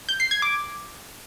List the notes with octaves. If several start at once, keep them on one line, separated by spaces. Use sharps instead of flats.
G6
C7
G#6
D6